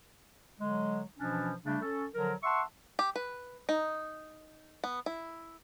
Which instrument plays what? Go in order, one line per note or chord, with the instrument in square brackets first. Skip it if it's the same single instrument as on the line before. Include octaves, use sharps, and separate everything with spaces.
[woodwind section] D3 F#3 G#3
B2 E3 F3 C#4 D4
C#3 G3 A3 D4
C#4 A4
D3 F3 F#3 A#4
E5 F#5 A5 C6 C#6
[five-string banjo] G4
B4
D#4
B3
E4